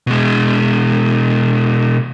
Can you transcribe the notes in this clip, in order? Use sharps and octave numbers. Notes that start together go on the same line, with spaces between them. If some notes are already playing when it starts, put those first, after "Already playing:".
B2 G#3